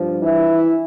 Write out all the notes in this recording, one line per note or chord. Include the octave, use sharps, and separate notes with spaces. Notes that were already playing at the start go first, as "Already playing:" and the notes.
Already playing: G2 F3
E3 E4